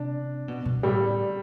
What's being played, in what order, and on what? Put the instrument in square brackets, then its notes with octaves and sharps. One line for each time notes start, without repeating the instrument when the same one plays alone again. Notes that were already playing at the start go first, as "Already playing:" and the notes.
Already playing: [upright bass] C3 [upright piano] D4
[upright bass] B2
B2
[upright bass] A2 [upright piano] G3